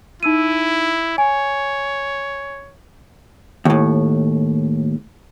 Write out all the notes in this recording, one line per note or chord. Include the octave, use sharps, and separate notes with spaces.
D#4 E4 E6 D#7
C#5 G#5
D#2 A2